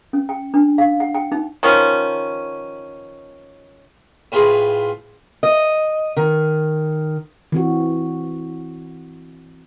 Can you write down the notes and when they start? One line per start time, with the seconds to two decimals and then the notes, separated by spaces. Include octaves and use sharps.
0.13 C#4
0.29 G5
0.54 D4
0.78 F5
1.00 F#5
1.15 G5
1.32 D#4
1.63 D#3 F3 C#4
4.32 A2 C4 F4 G#4 B4 C6
5.43 D#5
6.16 D#3
7.52 E3 C4 F#4